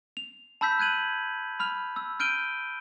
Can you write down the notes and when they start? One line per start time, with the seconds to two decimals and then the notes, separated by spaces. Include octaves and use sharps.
0.17 F7
0.61 A5 B5 E6 G6 B6
0.79 F#6 G#6 D#7 F#7
1.60 B5 F6 F7
1.96 E6
2.20 F6 G6 D7 D#7 G7